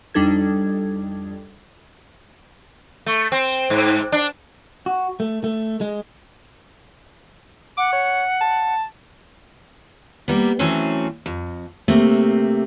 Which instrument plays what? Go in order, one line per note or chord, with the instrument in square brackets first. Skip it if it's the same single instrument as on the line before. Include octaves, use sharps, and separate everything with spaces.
[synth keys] F2 G3 D4 D#4 A4 G#6
[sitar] A3
C4
G#2
D4
[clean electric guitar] F#4
A3
A3
G#3
[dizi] F#5 [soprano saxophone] D6
[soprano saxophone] C#5
A5
[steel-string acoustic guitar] G3 A#3 B3
E3 F#3 A3 C4 C#4 C5
F2
C3 A3 A#3 C4